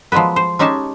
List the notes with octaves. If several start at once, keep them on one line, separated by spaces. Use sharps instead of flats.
F3 F#3 G#3 B3 B4
C5
G#3 C#4 D#4 G4 G#4 A5